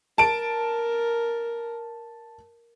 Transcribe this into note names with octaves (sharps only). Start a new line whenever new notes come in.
A#4 A5 D7